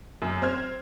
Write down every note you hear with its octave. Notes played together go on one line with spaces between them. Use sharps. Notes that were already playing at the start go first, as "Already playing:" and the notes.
F#2
C4 C5 F6 G#6